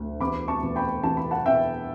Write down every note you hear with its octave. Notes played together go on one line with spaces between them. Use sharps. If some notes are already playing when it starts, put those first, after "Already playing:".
Already playing: D2
E2 B5 D6
A5 C#6
E2
G5 B5
E3 A5
B5
F#5 A5
E2 E5 G5